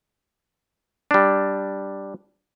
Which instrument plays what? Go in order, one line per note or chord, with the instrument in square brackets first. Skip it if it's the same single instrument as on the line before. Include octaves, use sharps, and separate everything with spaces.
[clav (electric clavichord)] G3 D4